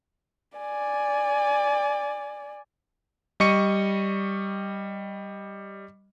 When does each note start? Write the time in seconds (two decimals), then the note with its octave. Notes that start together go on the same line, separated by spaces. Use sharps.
0.58 D5 G#5
3.40 G3 D#5 C#6 C#7 D#7